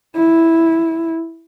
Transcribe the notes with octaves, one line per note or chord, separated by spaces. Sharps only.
E4